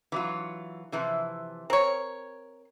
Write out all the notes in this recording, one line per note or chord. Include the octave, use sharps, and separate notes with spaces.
E3 F#3 F4
C3 E3 F3
C4 A#4 C#5